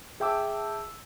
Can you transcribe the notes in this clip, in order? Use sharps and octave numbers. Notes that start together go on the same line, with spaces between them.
G#4 E5 G5 A5 D6 E6